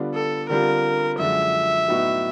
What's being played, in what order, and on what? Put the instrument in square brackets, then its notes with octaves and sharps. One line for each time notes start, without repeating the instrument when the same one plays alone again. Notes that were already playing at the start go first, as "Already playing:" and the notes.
Already playing: [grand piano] D3 G3 B3 D4 F4
[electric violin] A4
[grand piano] D3 G3 C4 F4 [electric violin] A#4
[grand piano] F#2 D3 F3 G#3 [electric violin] E5
[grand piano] A2 F#3 B3 D#4 F#4